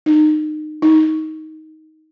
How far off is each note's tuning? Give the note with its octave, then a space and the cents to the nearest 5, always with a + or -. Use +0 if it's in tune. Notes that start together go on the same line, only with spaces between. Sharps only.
D#4 -25
D#4 +15